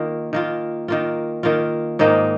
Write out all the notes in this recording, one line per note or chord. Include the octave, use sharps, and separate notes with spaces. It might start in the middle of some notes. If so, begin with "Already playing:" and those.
Already playing: D#3 A#3 F4
D#3 A#3 F4
D#3 A#3 F4
D#3 A#3 F4
G#2 D#3 A#3 D#4